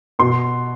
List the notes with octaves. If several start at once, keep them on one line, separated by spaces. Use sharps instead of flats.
B2 C6